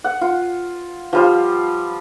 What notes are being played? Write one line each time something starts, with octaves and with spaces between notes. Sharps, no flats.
F#5
F4
F3 G3 F4